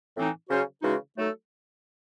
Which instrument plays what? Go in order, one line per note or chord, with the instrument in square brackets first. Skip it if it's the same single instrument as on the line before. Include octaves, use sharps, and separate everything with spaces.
[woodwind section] A2 E3 C4 D#4
C#3 F#3 C#4 F#4 C5
C#3 E3 G#3 D#4 F#4
F#3 A3 D#4 A4